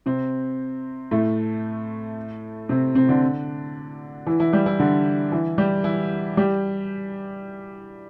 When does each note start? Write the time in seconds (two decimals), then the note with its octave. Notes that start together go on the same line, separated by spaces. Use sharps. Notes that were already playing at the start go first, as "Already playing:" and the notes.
0.06 C3 C4
1.11 A2 A3
2.69 C3 C4
2.95 C3 C4
3.09 D3 D4
4.27 E3 E4
4.40 E3 E4
4.53 G3 G4
4.66 E3 E4
4.79 D3 D4
5.32 E3 E4
5.58 G3 G4
5.84 E3 E4
6.37 G3 G4